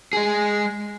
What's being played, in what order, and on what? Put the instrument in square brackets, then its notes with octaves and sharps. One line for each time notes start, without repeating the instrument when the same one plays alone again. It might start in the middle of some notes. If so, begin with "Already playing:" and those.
[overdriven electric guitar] G#3 G#4